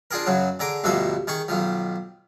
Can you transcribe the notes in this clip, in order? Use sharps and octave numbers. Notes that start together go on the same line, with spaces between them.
D4 F4 G#4 A#4
F#2 C#3 F#3
D3 G#4 A#5 D6
D2 G2 B2 F3 A#3 E5
D#3 G#4 C#6
B1 D#3 F3